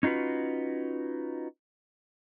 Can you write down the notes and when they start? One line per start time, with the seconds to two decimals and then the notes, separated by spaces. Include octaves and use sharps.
0.03 C#4 D#4 F4 F#4 B4